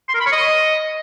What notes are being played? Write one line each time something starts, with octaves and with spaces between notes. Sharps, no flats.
C6
A#4
B5
C#5
D#5